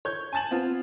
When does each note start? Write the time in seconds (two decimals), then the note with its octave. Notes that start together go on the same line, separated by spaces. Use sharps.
0.05 C#5 G6 G#6
0.33 G#5 A5 A6 E7 F#7
0.51 B3 C4 F4